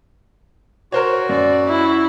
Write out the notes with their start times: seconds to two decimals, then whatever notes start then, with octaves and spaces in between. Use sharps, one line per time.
0.92 F#4 A#4 C5 C#5
1.29 F#2 D5
1.68 E4